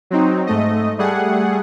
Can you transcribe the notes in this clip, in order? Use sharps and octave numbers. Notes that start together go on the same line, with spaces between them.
F#3 C4 D#4
G#2 A3 D#5
G3 A3 G#4 F#5